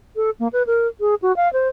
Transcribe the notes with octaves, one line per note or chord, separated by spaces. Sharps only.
A4
A#3
B4
A#4
G#4
F#4
F5
C5